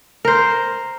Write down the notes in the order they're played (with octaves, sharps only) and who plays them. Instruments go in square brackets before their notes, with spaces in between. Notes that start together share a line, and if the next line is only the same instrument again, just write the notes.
[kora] A#4 C5